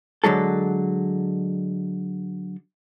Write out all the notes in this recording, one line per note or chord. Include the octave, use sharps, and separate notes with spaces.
D3 F#3 G#3 A4